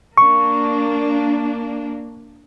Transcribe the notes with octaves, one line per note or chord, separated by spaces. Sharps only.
A#3 D4 C#6